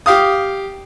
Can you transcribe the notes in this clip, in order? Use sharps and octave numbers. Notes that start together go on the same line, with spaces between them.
G4 F5 D#6